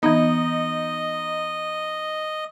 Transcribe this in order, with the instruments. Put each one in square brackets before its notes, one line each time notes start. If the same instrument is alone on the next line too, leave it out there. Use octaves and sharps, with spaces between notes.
[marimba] E3 B3 [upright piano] D#4 [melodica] D#5